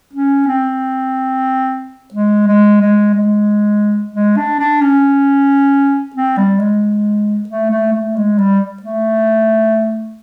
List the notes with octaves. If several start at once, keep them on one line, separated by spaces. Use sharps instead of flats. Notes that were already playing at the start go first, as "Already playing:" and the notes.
C#4
C4
G#3
G#3
G#3
G#3
G#3
D4
D4
C#4
C4
G3
G#3
A3
A3
A3
G#3
G3
A3